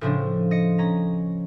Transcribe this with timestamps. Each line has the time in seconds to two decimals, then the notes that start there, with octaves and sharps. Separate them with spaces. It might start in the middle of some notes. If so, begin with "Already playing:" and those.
0.01 A2 C#3 F3 D4
0.51 D#5 C#7
0.78 C#4 A#5